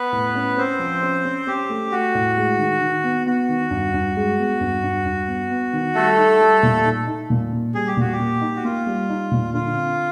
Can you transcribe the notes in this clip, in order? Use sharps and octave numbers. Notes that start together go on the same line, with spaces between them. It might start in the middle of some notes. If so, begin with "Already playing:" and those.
Already playing: B3 B4
A2
C#4
C4 C#4 C5
F3
C#4
C#4
C#4 G4
A3
A3 F#4
A2
G#3
D#3
D#3
B3
B3 F#4
D#3
G2
G2
G#3
B3
G2
G2
G2
B3
B3
D#3
G3 A3 A4
D#4
G3
A#2
D#4
D#4
A#2
A#3
G3 G#4
G4
A#2 F#4
G4
A#3
D#4
F#4
A#3 F4
G3
D#4
A#2
D3 F4
C4